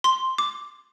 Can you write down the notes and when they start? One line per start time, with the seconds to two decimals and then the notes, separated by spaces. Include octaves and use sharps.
0.04 C6
0.38 D6